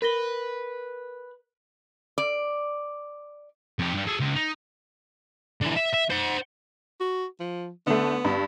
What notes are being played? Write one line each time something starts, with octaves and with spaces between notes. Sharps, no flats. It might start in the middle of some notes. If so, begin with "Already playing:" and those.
A#4 B4 A#6 G7
D5
F2 G4
G2 G3
G#4 A4
C#2
D#4
D3 E3
E5
E5
C5 F#5
F#4
F3
D3 A3 B3
G2